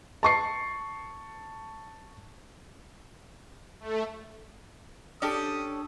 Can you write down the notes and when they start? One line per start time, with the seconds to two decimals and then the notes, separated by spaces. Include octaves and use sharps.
0.23 A5 C#6 C7
3.80 A3
5.22 C#4 D4 G4 A4 D#6